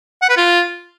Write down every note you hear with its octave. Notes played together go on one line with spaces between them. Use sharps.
F#5
B4
F4